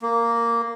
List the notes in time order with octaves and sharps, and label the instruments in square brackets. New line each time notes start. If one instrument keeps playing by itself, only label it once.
[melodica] A#3